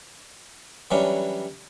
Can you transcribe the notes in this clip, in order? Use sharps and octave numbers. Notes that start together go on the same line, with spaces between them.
E3 F#3 G3 C#4 D4